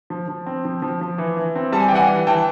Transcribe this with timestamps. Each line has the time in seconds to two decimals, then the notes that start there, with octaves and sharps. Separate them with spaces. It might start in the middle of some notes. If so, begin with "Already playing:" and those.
0.10 F3
0.28 F3
0.46 C4
0.65 F3
0.82 F3
1.01 F3
1.18 E3
1.37 E3
1.55 C4
1.72 G3 A5
1.80 G#5
1.88 G5
1.91 E3 F#5 G#5
2.09 E3
2.27 E3 G5 A5